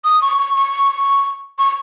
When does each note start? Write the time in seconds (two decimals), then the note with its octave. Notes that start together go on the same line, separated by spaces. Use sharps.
0.05 D#6
0.22 C#6
0.39 C#6
0.55 C#6
1.59 C#6